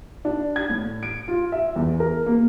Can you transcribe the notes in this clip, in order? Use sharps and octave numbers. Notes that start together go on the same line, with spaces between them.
D4
G#6
A2
D7
F4
E5
E2
A#4
A#3